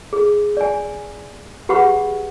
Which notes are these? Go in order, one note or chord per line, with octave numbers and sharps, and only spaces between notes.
G#4
D5 G#5
G4 G#4 B4 F#5 B5 C#6